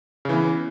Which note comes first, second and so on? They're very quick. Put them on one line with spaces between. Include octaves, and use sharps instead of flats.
C#3 E3 B3